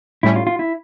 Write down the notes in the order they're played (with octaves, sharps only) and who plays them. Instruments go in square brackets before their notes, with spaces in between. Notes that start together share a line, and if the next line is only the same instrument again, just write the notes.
[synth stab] A2 G3 C#4 [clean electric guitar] E4
[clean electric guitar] F4
F4
E4